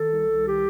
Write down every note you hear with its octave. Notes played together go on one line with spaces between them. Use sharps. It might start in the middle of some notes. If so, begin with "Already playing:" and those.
Already playing: D#3 A4
C2
C2
D#3 G4